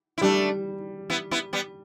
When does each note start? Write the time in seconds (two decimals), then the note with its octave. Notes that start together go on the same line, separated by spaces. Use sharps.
0.18 E4
0.21 G3 A3 D4
1.10 B3 E4
1.31 B3 E4
1.53 G3 B3